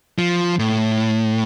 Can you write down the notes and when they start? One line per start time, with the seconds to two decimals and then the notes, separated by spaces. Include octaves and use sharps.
0.18 F3
0.59 A2